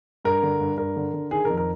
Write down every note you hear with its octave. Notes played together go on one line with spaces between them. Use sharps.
G2 A#4
D3
G2
G2 A#4
D3
D3
D#3 G#4
A#4
F2
A#4